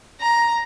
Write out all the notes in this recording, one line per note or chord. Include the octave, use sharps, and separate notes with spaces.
A#5